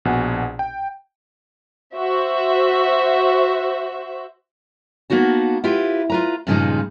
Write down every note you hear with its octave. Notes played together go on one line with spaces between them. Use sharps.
A#1 B2 F#5 G#5
G5
F#4 C5 E5
A#3 B3 D#4 F#4 A5
E4 F4 G4 B4
F4 B4 A#5
G2 A#2 C#3 F3 G#3 D#4